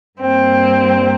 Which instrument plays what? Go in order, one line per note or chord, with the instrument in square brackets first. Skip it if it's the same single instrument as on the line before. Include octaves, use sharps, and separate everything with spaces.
[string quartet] G2 G3 A#3 C4